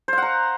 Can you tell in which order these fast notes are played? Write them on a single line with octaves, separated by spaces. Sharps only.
C5 F5 F#5 A#5